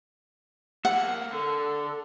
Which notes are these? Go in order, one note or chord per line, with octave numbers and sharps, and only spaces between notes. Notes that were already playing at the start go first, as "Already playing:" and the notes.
A#3 A4 F#5
D3 A4